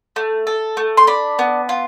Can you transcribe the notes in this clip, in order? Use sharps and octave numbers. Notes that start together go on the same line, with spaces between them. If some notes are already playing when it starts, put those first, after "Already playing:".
A3
A4
A3
C6
D4 B5
B3
F4